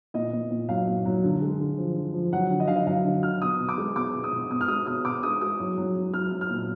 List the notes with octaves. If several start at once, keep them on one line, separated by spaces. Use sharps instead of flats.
A#2 D#5
A#2
A#2
F#3 F5
A#2
F#3
D3
G#3
D3
F3
D3
F3
F#3 F#5
D3
D#5
D3 F5
D#5
F#3 F5
D3
D3 F6
B2 D#6
B2
D6
G#3
B2 D6
B2
D#6
B2
B2 D#6
F6
G#3 D#6
B2 D#6
B2 D6
G#3 D#6
G#3 D#6
F#3
F#3
F#3
F#3 F6
F#3
F6
A#2